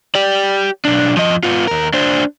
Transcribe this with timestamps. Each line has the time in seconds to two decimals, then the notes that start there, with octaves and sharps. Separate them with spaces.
0.15 G4 D5
0.85 B1 D4
1.17 F3 D#5
1.43 B3 F4
1.67 D#2 A#4
1.93 D4 C5